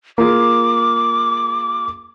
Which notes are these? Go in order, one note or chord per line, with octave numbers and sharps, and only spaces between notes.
A#3 F4 G#4 D6